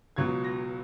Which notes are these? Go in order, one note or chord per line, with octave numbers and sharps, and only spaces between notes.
C#2 B2 F#3 G#6
A#6